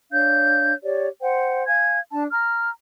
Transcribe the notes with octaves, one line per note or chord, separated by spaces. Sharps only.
D4 C#5 F5 G6
G4 C#5 D5
C5 F#5 G5
F5 G#5 G#6
D4 A5
A#5 F6